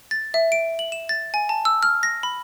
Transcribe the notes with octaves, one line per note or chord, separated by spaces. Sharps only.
A6
E5
D7
F#7
E7
A6
G#5
A5
E6
F6
A#6
B5